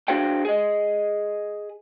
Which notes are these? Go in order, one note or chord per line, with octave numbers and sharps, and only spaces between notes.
D4 F#4 G#4 C5 F5 G5
G#4 D#5